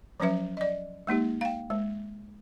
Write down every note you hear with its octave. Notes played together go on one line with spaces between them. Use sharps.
F3 F#3 C#4 B4 E5
D5 D#5
G#3 A#3 D#4 G4
F5 G5
G#3